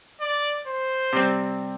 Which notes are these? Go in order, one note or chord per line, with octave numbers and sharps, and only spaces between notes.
D5
C5
C3 G3 C4